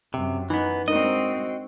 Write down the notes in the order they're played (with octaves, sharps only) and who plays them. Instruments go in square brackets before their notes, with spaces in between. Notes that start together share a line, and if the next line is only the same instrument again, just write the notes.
[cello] F#2 [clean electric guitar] C3
[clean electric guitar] E3 B3 [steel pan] D#4
[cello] G#3 C4 [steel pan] D4 D#4 A#4 [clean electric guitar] F#4 D#5